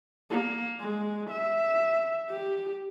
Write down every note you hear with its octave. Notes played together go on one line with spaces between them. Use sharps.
A#3
G#3
E5
G4